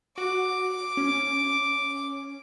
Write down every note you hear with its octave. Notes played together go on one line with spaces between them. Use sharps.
F#4 D6
C#4